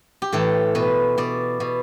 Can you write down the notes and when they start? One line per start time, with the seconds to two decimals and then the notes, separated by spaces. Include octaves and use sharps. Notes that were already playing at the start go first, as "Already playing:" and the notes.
0.22 G4
0.32 A2 E3 A4
0.75 B2 B4
1.18 B2 D5
1.60 B2